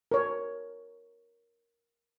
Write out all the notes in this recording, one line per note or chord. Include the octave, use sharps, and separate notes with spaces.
A#4 C#5